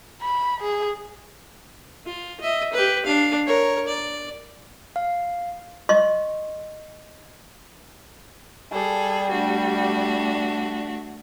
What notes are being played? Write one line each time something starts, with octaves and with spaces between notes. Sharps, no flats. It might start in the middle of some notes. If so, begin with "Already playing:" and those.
B5
G#4
F4
D#5 E5
G4 B4
D4 F5
A#4 C#5
D5
F5
D#5 C6 C#6
G3 G#4 A4
A3 D4 F#4